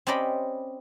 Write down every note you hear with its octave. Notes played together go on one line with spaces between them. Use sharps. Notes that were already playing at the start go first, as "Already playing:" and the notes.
C4 C#4 G4 D5 D#5 B5